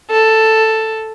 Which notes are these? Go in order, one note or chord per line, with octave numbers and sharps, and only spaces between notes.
A4